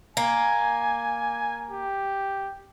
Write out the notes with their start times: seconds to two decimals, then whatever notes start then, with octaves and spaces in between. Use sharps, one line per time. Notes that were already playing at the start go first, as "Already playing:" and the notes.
0.17 A#3 G#5
1.71 G4